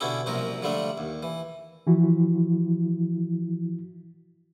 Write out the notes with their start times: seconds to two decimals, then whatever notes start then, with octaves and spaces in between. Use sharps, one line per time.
0.01 B2 D3 C#4 E4 G4
0.26 C2 F#2 A#2 F3 C4 A#4
0.62 D3 F3 G3 A3 D4
0.98 D#2
1.23 E3
1.87 E3 F3 E4 F#4